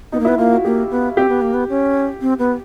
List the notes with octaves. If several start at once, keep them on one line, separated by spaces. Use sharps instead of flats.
B3 D#4
A#3
E4
B3
A#3 F4
F#4
A#3 G4
B3
C4 G4
B3
A#3
B3
C#4
C4
B3